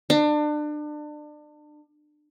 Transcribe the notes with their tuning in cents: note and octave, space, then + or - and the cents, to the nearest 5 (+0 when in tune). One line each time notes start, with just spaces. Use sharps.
D4 +30